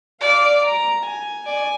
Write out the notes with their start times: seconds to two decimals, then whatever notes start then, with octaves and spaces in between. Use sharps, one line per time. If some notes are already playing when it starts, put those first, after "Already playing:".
0.21 D5 F5
0.63 A#5
1.04 G#5
1.46 D5 G#5